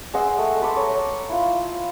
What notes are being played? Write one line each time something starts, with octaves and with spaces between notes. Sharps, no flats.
G#3 D#5 F#5 E6
A3
A4 B5 C6 D6
C#5 A#5
E4 F4